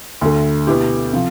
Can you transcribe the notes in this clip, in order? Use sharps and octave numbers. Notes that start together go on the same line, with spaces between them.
D2 D3 A3
B2 B3 E4 G4
C3 F3